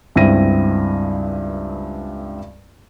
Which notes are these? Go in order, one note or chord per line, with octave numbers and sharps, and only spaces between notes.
C#2 G2 C4 E4 A#6 D#7